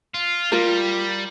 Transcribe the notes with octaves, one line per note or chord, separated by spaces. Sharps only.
F4
G3 F4 A#4